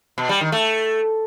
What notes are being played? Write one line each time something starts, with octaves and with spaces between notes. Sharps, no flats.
B2
G3
D#3
A3